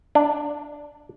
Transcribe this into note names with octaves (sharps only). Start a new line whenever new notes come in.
D4